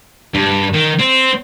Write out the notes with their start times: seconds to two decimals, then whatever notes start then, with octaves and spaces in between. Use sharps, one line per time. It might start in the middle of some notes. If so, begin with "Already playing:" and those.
0.34 G2
0.74 D#3
0.99 C4